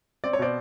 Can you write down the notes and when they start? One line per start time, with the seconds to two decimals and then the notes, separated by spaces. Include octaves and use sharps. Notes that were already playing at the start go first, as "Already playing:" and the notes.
0.24 C4 D5
0.33 C#5
0.39 B2 C5 D5